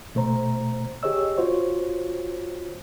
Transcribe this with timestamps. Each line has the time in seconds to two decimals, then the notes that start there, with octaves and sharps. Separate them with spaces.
0.15 B2 A3 C5 A#5
1.03 G4 G#4 C#5 D#5 E6
1.38 F4 F#4 C5 C#5